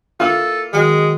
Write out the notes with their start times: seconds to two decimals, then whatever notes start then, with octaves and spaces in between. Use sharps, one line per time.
0.20 A#3 E4 F4 A4
0.73 D#3 F#3 G#3 G#5